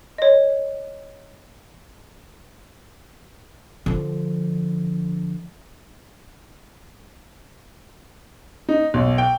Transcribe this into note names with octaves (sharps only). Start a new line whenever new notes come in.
C#5 D#5
D3 F3
D#4
B1
G5